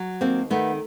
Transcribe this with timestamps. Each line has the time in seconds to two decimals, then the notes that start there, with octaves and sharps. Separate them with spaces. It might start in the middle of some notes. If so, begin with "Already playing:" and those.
Already playing: F#3
0.21 D#2 A#3 C4
0.50 D#3 A3 B3